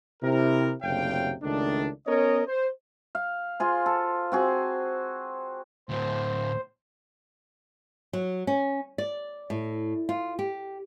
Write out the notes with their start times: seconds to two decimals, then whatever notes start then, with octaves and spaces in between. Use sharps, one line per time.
0.23 C3 E4 A#4
0.83 F#1 D2 C3 C#5 F5 G5
1.43 C#2 D#3 A3 D4
2.08 B3 C#4 A#4 C#5 D#5
2.47 C5
3.15 F5
3.60 F4 G#4 C5
3.86 A4
4.32 C4 F#4 G#4
5.89 D2 A2 C5
8.13 F#3
8.47 C#4
8.98 D5
9.50 A2
10.09 F4
10.39 G4